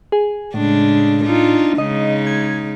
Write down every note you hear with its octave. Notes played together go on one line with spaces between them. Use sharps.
G#4
A2 C#3 G#3 D4
D4 D#4 F4
C#3 G#3 D#4 D#5
G#6